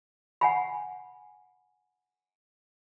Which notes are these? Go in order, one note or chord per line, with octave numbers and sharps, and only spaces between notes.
F#5 G#5 B5